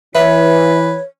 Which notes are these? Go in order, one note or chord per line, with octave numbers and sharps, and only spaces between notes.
E3 B4 C#5 E5